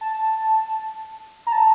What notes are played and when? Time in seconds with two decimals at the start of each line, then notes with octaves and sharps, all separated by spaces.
0.01 A5
1.47 A#5
1.52 A5